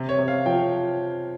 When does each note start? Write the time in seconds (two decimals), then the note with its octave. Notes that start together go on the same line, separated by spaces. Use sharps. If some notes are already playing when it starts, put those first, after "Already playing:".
Already playing: C3
0.09 C#5
0.18 C3
0.28 F5
0.46 F3 G5